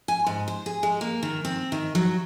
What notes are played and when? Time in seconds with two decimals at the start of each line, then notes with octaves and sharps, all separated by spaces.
0.08 G#5
0.27 G#2
0.48 C5
0.66 G#4
0.83 G#3
1.01 A#3
1.23 D#3
1.45 C4
1.72 D#3
1.95 F#3